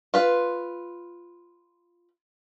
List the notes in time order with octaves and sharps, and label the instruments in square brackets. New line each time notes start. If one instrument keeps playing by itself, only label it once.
[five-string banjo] F4 B4